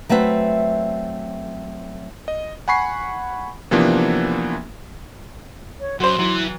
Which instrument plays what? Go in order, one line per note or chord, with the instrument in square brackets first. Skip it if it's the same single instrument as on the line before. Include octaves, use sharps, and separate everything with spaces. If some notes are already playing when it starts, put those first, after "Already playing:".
[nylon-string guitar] F#3 A3 C4 B4 E5
[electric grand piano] D#5
F#5 G#5 B5 C#6 C7
C3 E3 F3 A#3 B3 D4
[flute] C#5
[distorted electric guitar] F#2 [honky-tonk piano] F#4 C5 [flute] C6
[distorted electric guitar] E3 [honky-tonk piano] F#3